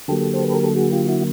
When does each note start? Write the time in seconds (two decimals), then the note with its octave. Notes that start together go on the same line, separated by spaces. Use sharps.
0.08 D3 F#3 A#3 G4 A4
0.34 C5
0.43 B4
0.55 A#4
0.64 A4
0.75 F#4 G#4
0.91 F4 G4
1.09 E4 F#4